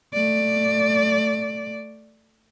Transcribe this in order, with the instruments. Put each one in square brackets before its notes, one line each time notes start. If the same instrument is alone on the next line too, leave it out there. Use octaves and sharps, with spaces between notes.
[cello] A3 D5